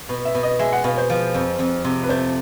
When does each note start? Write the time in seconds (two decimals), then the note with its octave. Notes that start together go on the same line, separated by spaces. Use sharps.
0.09 B2
0.25 E5
0.35 B2
0.43 D#5
0.59 G#3 E5
0.72 F#5
0.84 B2 F5
0.98 C5
1.10 F3
1.34 F2
1.59 F2
1.84 C3
2.03 B4
2.09 A3 C5